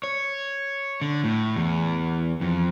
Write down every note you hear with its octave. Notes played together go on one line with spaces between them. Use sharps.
C#5
D3
A2
E2
F2